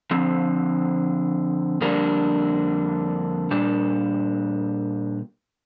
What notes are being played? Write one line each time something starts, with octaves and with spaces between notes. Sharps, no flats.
D3 F3 C4
F2 D3 G3 A#3 D4
A#2 G3 D4